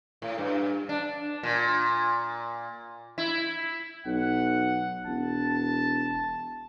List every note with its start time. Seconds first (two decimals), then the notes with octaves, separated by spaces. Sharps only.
0.22 A2
0.38 G2
0.89 D4
1.43 A#2
3.18 E4
4.06 B1 F#5
5.07 E1 A5